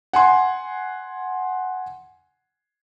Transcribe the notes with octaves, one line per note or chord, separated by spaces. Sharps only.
F#5 G#5 C6